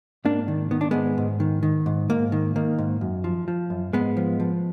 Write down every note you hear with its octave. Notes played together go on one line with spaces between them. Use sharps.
G#2 A#3 D4
D#3
D#3 B3
D4
G#2 G#3 B3
G#2
D#3
D#3
G#2
G#2 A#3
D#3
D#3 A#3
G#2
F#2
F3
F3
F#2
G#2 G#3 B3
F3
F3